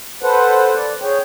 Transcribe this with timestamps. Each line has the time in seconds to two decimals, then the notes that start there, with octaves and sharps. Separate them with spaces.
0.23 A4 B4 C5 F#5
0.75 D5
1.02 G#4 C#5 G5